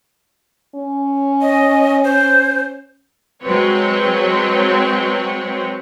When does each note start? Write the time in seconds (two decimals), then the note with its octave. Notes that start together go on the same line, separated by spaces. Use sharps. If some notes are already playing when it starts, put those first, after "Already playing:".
0.75 C#4
1.41 D#5
2.04 C5
3.44 F#3 G#3 C4 F#4 B4 C#5